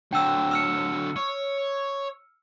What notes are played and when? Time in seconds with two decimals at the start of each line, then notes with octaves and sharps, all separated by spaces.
0.13 D3 F#3 G5 E6
0.51 E6 F6 C#7
1.16 C#5